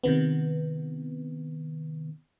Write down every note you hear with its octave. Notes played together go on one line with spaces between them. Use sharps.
C3 D#3 B3